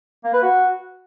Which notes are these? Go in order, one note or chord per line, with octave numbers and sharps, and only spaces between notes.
A#3
B4
F#4